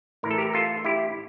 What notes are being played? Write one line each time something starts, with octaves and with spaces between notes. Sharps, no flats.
A2 E3 A#4
A4
G4 A#4
F4 A4
E4 G4